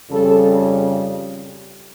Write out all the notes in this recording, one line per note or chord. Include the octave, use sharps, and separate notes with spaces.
F2 C#3 G3 A4